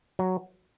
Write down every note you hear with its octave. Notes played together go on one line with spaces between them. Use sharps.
F#3